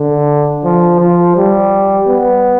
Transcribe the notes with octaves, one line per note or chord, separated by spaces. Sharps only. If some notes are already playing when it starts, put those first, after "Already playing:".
Already playing: D3
F3
F3
G3
B3